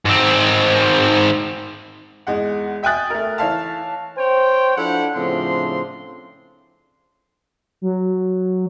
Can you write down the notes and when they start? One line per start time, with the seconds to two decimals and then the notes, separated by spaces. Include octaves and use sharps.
0.05 G#2 C4
2.27 E2 G#3 F#5
2.83 E5 G5 G#5 D#6 F#6 A6
3.10 A3 A#4
3.38 E3 C#5 F5 A5
4.17 C5 C#5 G5
4.77 F3 D4 E4 A4 F#5
5.15 A2 C#3 F3 C4 D4 C6
7.81 F#3